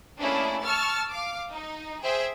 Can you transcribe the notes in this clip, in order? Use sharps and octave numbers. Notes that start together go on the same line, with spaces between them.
A3 A#3 C#4 D4 E4 G#4
A5 C#6 E6 F6 A6
F5 D6
D#4
G#4 C5 E5 G5